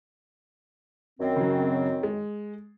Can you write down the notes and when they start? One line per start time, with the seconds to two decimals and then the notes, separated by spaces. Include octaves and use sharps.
1.20 F#2 D#3 C4
1.36 C#3 F#3
2.03 G#3